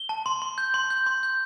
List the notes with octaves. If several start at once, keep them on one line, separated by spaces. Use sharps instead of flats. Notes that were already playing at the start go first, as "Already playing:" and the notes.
Already playing: G7
A5
C6
C6
G6
C6
G6
C6
G6